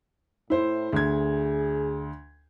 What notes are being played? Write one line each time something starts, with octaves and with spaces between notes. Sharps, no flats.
A2 E4 C5
D2 G#4 G#6